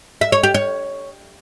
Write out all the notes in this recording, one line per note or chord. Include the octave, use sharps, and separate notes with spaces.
E5
C#5
G4
C#5